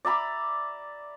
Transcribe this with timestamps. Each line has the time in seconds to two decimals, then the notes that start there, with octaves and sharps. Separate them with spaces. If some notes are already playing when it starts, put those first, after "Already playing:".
0.05 D5 E5 A#5 B5